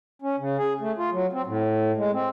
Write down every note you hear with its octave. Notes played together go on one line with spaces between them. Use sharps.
C#4
C#3
G#4
A3
F4
F#3
C4
A2
G#3
C4